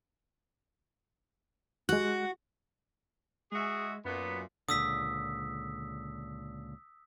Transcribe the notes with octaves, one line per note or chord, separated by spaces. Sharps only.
G#3 F#4 F#6
G#3 F#4 G#4 E5
F#2 A#2 B3
C#2 A#2 D3 D#6 E6 B6